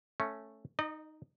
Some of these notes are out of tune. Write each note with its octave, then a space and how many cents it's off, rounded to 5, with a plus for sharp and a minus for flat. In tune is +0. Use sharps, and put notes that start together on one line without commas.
A3 +0 C#4 -5
D#4 +0 D#5 -40